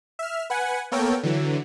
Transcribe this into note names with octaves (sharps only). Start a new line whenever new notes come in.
E5 F6
B4 F#5 G#5
A#3 B3 A4 A#4 C#5 G5
D3 E3 F#3